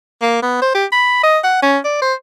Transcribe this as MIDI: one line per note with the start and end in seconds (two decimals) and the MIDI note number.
0.22 0.42 58
0.42 0.58 59
0.62 0.70 72
0.75 0.86 67
0.92 1.21 83
1.23 1.38 75
1.44 1.61 78
1.62 1.78 61
1.85 1.97 74
2.02 2.14 72